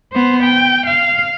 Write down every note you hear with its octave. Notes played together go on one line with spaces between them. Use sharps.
B3 C5
G5
F5